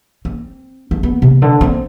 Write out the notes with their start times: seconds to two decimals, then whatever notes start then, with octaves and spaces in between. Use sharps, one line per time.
0.25 C4
0.91 A3
1.03 B3
1.22 C3
1.42 D3
1.61 C4